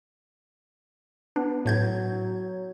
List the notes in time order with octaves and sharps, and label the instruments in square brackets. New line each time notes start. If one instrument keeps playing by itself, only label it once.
[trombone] B3 [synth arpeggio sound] D4
[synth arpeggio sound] A2 G6 G#6 [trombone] F#3